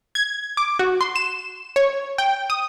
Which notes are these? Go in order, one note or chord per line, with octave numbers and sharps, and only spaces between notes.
G#6
D6
F#4
C6
E7
C#5
G5
D#6